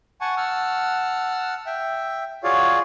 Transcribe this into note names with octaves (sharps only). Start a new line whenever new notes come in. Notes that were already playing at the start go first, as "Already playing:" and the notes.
F#5 G#5 A5 C#6
F#5 A5 E6 F6
E5 G5
F4 F#4 G#4 C#5 D5 F5